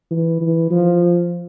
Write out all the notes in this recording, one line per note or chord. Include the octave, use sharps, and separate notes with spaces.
E3
E3
F3